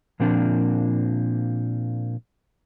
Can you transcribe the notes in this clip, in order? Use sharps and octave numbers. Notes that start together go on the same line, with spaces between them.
A#2 F3 A#3 C4 D4